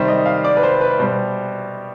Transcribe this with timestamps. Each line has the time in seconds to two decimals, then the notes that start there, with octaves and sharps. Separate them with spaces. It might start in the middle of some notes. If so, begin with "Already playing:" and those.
Already playing: C3 D#3 G3 C5
0.08 D#5
0.26 F5
0.44 D5
0.57 B4
0.63 C5
0.81 B4
0.99 B2 G3 C5